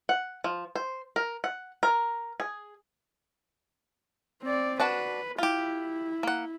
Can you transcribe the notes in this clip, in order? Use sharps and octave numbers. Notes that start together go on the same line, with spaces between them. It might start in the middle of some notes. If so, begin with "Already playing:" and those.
F#5
F3
C5
A#4
F#5
A#4
G#4
C4 D5
D4 F#4 B4 A5
E4 F4 G4
A#3 F#5